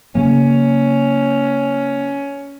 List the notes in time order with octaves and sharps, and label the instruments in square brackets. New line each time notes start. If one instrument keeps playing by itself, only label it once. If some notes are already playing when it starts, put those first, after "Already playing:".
[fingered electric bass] C#3 F#3 A#3 [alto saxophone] C#4